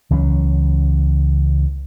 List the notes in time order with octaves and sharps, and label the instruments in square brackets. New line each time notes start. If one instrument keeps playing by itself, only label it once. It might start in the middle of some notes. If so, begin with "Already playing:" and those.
[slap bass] C#2 E3 F#3 C#4